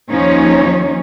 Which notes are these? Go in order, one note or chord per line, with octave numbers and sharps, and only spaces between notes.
D#2 F3 C#4 D#4 C#5